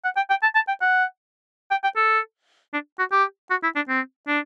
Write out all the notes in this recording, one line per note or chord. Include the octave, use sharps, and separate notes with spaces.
F#5
G5
G5
A5
A5
G5
F#5
G5
G5
A4
D4
F#4
G4
F#4
E4
D4
C4
D4